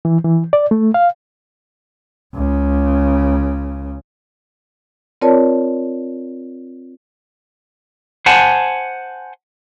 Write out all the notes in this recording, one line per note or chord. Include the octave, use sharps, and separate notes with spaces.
E3
E3
D5
A3
F5
C#2 C#3
C4 F4 A#4 C#5 D5 A5
C5 F#5 G#5 A5